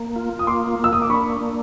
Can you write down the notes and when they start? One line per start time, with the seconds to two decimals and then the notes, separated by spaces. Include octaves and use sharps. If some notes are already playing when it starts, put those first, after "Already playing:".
Already playing: A#3
0.16 F4
0.39 D#6
0.47 A#3 C6 D6
0.79 A#3 E6
0.93 D#6
1.02 D6
1.10 D4 B5 C#6
1.41 A#3